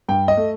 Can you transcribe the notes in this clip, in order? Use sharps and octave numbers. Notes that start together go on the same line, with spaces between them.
G2 G5
D#5
A3